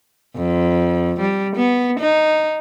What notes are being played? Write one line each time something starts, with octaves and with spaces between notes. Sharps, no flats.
F2
G3
B3
D#4